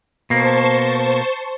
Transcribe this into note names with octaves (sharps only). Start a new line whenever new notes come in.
B2 A#3 C5 A5 C#6